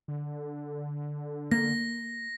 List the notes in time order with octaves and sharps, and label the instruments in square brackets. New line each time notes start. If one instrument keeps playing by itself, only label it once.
[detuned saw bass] D3
[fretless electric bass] A#3 [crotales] A#6